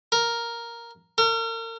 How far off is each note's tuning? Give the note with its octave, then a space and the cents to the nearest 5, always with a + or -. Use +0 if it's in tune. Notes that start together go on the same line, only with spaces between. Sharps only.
A#4 +0
A#4 -40